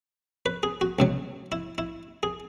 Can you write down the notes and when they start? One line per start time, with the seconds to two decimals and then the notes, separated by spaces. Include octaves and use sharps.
0.46 B4
0.63 G#4
0.81 F#4
0.99 C#2 B2 F#3
1.52 E4
1.78 E4
2.23 G#4